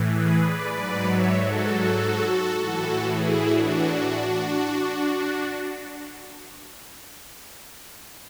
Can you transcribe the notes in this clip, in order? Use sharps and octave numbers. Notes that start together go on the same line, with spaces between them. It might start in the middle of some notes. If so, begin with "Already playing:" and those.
Already playing: A2 E3
G#4 B4
B4 D5
G#2 F#3 B4 D5
C#5 E5
F#4 A4
A2 E3 F#4 A4
E4 G#4
D4 F#4